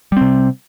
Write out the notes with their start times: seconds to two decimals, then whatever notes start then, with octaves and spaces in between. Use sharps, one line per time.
0.12 G3
0.17 C4
0.21 C3